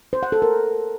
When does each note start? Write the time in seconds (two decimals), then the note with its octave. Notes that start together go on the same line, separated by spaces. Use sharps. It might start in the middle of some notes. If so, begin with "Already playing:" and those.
0.13 C5
0.23 F#5
0.32 A4
0.42 A#4